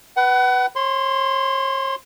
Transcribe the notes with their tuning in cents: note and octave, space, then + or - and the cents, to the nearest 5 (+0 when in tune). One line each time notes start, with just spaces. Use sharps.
B4 +0 F#5 +30
C#5 -40 C6 -5